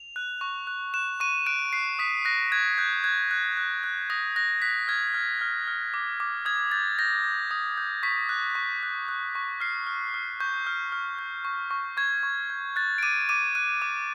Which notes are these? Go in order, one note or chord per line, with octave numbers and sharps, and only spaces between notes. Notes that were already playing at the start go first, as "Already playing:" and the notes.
Already playing: F7
F#6
C#6
F#6
F#6 E7
C#6 D#7
F#6 D7
F#6 C7
D#6 B6
F#6 A#6
F#6 G#6
F#6 G6
F#6 G#6
F#6
F#6
F#6
D#6 A#6
F#6 A#6
F#6 B6
F6 G#6
F6
F6
F6
D6
D6
D#6 G#6
G6 A6
G6 A#6
G6
D#6
G6
C#6 B6
F#6
C#6
F#6
F#6
C#6
F6 C7
F6
F6
C#6 G6
F6
F6
G6
C#6
C#6
C#6 G#6
C#6
G6
F#6 A6
D7
D6 D#7
D6 D#7
F#6 D#7
D6